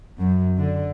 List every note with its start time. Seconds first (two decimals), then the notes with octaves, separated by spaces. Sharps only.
0.19 F#2
0.57 D3